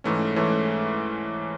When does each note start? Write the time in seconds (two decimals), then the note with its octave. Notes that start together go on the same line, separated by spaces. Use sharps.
0.04 G#2 E3 A3 C#4
0.36 G#2 E3 A3 C#4